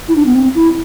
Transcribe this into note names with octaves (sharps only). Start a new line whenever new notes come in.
E4
D4
B3
C4
E4